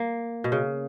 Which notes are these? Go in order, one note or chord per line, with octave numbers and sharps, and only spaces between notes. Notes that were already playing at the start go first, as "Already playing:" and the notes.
Already playing: A#3
B2
C#3